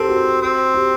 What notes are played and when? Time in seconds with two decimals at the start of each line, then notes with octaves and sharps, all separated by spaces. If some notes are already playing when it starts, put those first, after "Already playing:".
Already playing: C4 G4 A4 A#4
0.09 F#4
0.42 C4
0.74 G4